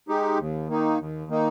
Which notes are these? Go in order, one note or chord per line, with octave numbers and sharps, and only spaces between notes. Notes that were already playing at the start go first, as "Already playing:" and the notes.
G#3 D#4 G4
D#2
D#3 A#3 D#4
D#2
D#3 A#3 D#4